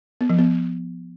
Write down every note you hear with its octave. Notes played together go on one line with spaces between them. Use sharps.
B3
F3
B3